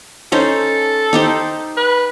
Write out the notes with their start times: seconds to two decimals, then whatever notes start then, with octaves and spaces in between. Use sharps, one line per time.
0.32 C#4 D#4 A4 C5
1.13 D#4 G4 C5
1.77 B4